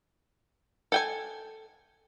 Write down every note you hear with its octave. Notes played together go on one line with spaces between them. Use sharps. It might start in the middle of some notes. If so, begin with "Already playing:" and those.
A4 G5 G#5